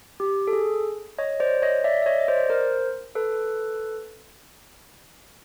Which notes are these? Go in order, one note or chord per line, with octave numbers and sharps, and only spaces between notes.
G4
A4
G#4
C#5 D#5
C5 D5
C#5 D#5
D5 E5
E5
C#5 D#5
D#5
C5 D5
A#4 C5
A4 B4